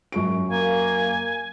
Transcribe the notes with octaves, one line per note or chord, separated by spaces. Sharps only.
F#2 C#6 D7
A#3 G#5